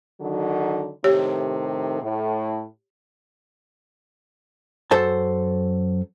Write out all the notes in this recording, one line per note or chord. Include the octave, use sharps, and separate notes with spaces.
D3 D#3 F#3
A2 C3 D#3 G4 C#5
A2
F#2 A4 C5 A5